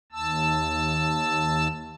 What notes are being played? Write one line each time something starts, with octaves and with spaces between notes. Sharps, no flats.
D#2 A5 E6